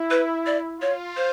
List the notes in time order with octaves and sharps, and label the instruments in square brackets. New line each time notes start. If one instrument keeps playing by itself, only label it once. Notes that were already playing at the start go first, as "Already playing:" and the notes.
Already playing: [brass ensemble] E4
[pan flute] B4
D5
[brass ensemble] F4 [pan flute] C#5
[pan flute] C5